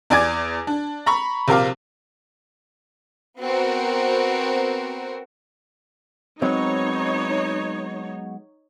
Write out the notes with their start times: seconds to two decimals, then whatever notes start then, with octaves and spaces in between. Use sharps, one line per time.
0.10 E2 D5 G#5 D6 G#6
0.67 D4
1.06 A#5 B5 C#6
1.48 A#1 C3 A#4 F5 D6
3.42 B3 C4 F#4 A#4
6.42 F#3 G#3 B3 C4 D#4 C#5